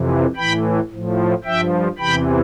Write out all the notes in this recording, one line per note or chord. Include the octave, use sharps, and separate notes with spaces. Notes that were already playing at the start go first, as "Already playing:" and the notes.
Already playing: F2 C3 E3
A2 E3 G5 B5
A2 F3
G2 F3 E5 G5
E2 C3 E3 G5 B5